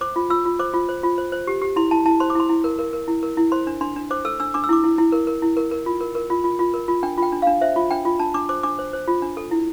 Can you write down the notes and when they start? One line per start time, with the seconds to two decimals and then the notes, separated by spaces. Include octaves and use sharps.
0.01 C5 D6
0.16 F4
0.30 F4 E6
0.45 F4
0.59 C5 D6
0.74 F4
0.89 C5
1.03 F4
1.18 C5
1.32 C5
1.47 G4
1.61 G4
1.76 E4 C6
1.91 E4 A5
2.06 E4 A5
2.20 C5 C6
2.30 D6
2.35 E4 C6
2.49 E4
2.64 A#4
2.79 A#4
2.93 A#4
3.08 E4
3.23 A#4
3.37 E4
3.52 C5 C6
3.67 D4
3.81 D4 C6
3.96 D4
4.11 C5 D6
4.25 A4 E6
4.40 D4 E6
4.54 D4 D6
4.64 E6
4.69 E4 D6
4.84 E4
4.98 E4
5.12 A#4
5.27 A#4
5.42 E4
5.57 A#4
5.71 A#4
5.86 F4
6.00 A#4
6.15 A#4
6.30 F4
6.44 F4
6.59 F4
6.74 A#4
6.88 F4
7.03 D4 G5
7.18 F4 G5
7.32 D4
7.42 F5
7.47 D4
7.61 C5 E5
7.76 F4
7.91 D4 G5
8.05 F4
8.19 D4 A5
8.34 D4 D6
8.49 C5 D6
8.63 D4 D6
8.79 C5
8.93 C5
9.08 F4
9.22 D4
9.37 A4
9.51 E4